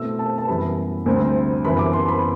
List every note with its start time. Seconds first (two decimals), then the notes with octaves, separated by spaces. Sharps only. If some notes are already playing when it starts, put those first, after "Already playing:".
Already playing: B2 A3 C4 E4 E6
0.19 A5
0.38 A5
0.48 F#2 E3 G3 B3 B5
1.06 D2 C3 G3 C4
1.65 F#2 E3 B3 E4 B5
1.79 D6
1.93 C6
2.08 B5